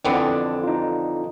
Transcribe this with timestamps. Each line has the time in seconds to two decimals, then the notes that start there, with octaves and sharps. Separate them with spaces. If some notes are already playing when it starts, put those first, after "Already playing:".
0.04 F2 D3 E3 B3 C4 D4
0.64 D#4 F4